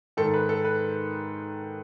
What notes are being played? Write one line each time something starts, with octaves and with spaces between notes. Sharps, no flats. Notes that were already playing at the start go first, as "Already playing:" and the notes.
G#2 D#3 A4
B4
A4
B4